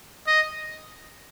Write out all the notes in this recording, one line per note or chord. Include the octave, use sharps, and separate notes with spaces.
D#5